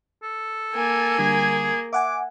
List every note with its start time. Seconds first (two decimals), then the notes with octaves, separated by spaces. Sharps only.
0.23 A4
0.75 A#3 G#5
1.19 D3 G3 G#4
1.93 E5 F#5 G#5 D6